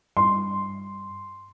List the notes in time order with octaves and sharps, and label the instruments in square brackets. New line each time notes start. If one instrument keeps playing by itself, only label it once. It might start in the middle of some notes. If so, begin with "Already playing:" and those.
[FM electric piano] G2 [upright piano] C6